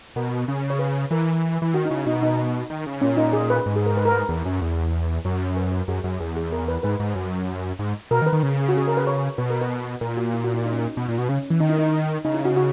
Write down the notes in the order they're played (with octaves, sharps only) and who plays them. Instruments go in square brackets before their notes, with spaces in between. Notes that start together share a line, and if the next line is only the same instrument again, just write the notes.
[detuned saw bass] B2 [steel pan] A#4
[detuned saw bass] C#3
[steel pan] C#5
B4
[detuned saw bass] E3 [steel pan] A#4
[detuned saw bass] E3
[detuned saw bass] D#3 [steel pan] F#4
[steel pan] D#4
[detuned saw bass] C#3 [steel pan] E4
[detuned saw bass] B2 [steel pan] D#4
[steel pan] D#4
[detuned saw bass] D#3
C#3
[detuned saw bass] A#2 [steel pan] C#4
[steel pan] D#4
G#4
B4
[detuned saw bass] G#2
[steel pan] G#4
A#4
B4
A#4
B4
[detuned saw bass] E2
F#2
E2
[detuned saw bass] F#2 [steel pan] C#5
[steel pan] B4
A#4
[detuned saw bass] F#2 [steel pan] G#4
[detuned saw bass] F#2
[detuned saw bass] E2 [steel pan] G#4
[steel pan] G#4
A#4
B4
[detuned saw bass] G#2 [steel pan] B4
[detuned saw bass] G#2
F#2
G#2
[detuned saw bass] B2 [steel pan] A#4
[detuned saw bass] D#3
[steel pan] B4
[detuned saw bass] D#3
C#3
[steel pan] F#4
G#4
A#4
B4
C#5
[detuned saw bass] B2 [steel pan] B4
[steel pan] A#4
B4
[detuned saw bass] A#2 [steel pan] A#4
[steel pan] F#4
E4
F#4
E4
D#4
C#4
D#4
[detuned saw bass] B2
A#2
B2
[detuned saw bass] C#3 [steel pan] C#4
[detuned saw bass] E3
[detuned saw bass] D#3 [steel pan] D#4
[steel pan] E4
D#4
[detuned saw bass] C#3 [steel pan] D#4
[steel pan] E4
F#4
F#4